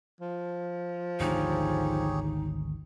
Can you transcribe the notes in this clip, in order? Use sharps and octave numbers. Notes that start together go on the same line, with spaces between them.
F3
G#1 D2 D4 D#4 G4 G#4 C#5